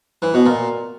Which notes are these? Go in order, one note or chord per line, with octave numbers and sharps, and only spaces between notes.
E3
B2
A#2